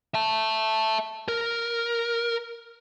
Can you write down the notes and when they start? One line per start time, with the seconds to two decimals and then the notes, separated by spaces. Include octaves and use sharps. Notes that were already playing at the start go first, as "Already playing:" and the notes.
0.14 E5 A5
1.28 A#4